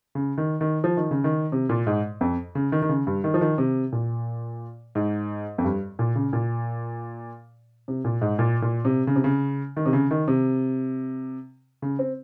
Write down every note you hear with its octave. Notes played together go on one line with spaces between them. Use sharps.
C#3
D#3
D#3
F3
D#3
C#3
D#3
C3
A#2
G#2
F2
C#3
D#3
D#3
C#3
G2
D#3
F3
D#3
C3
A#2
G#2
F2
G2
A#2
C#3
A#2
C3
A#2
G#2
A#2
A#2
C3
C#3
C3
C#3
D#3
C3
C#3
D#3
C3
C#3
C4